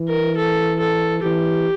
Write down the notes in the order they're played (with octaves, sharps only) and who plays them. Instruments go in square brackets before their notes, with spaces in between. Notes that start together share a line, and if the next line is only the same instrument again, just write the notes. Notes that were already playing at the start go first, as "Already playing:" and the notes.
Already playing: [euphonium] E3
[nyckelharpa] A#4
A4
A4
[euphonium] E3 [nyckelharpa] G4